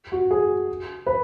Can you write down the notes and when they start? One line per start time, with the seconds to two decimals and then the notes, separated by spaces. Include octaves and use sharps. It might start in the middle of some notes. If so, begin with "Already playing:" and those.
0.12 F#4
0.31 G#4
1.06 B4